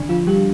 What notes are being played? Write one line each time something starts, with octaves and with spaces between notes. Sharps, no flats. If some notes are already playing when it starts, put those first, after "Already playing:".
Already playing: D3 D4
F3 F4
G3 G4